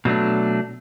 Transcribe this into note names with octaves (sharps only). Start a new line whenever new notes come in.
B2 F#3 A3 D4